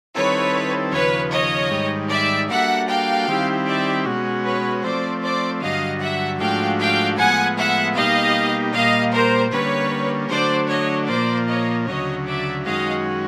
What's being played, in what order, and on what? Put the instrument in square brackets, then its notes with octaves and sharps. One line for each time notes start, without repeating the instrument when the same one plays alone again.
[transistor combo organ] D#3 G3 C4 E4 A4 [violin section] B4 C#5
[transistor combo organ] D#2 C#3 F3 [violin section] B4 C#5
[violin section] C#5 D#5
[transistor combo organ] G#2 D#3 G3
[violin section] D5 E5
[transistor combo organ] G3 A#3 D4 F#4 A4 [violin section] E5 F#5
[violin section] F5 G5
[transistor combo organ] D#3 G3 C4 E4 G4
[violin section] D5 E5
[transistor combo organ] B2 G#3 C#4 F#4
[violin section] B4 C#5
[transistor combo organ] F3 A3 C4 [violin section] C5 D5
[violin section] C5 D5
[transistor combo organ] G2 D3 F#3 [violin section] D#5 F5
[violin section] E5 F#5
[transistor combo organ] G#2 F3 A3 D4 F#4 [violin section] F5 G5
[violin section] F5 G5
[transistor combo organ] A2 F3 G#3 B3 [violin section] F#5 G#5
[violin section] E5 F#5
[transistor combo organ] B2 G3 A#3 D#4 G4 [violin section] D#5 F5
[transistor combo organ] A#2 G3 A#3 [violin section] D#5 F5
[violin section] A#4 C5
[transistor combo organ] D3 G3 A#3 C#4 [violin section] B4 C#5
[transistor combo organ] D3 F#3 A3 D4 [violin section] C5 D5
[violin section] C#5 D#5
[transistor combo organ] A#2 F3 A#3 [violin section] C5 D5
[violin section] C#5 D#5
[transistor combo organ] D2 C#3 F#3 [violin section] C#5 D#5
[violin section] D5 E5
[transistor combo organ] F#2 D#3 G#3 C#4 F#4 [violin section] D#5 F5